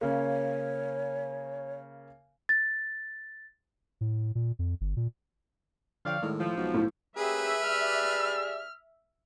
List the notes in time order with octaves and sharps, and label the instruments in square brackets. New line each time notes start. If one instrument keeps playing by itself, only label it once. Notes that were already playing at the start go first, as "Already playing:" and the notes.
[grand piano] C#3 A#3 [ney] C#5
[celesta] A6
[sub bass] A2
A#2
F2
G1
A#2
[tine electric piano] D3 F3 G5 [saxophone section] C#5 D5 F5
[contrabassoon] A2 [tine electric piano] D#3 G#3 A3
[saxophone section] F3
[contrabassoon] B1 [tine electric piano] G#3 F#4
[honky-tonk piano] A2
[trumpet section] A#3 C#4 G4 [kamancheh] G#4 [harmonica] B4 [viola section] E5
[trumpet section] G4 G#4 D5 [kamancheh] F6